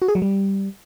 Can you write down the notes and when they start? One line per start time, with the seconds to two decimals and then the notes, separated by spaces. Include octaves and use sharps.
0.02 F#4
0.08 G#4
0.15 F#3
0.22 G3